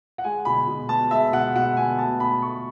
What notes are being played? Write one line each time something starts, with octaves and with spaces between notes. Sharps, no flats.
F#5
G#3 G#5
B2 B5
B2
B3 A5
G#3 E5
B2 F#5
B2 F#5
B3 G#5
A3 A5
B2 B5
A3 C#6